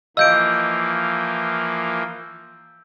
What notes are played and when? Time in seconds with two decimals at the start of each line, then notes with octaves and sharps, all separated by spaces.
0.17 E3 F3 A#3 D#5 F5 E6 G6 D7